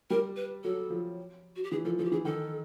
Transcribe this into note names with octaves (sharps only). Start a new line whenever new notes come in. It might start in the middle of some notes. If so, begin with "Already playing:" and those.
G3 A#4
B4
F#3 A4
F3
F#4
G4
E3 G#4
F3 A4
F3 A4
G4
E3 G#4
D#3 A4